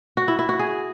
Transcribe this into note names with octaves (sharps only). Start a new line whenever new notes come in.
F#4
E4
E4
F#4
G#4